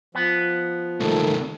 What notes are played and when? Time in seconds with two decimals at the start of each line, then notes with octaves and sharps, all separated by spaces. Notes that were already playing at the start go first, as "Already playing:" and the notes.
0.15 F3 B3
1.00 C2 G#2 D#3 A3